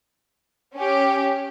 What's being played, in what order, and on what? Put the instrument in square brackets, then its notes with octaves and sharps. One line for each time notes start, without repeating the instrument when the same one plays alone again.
[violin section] C#4 G4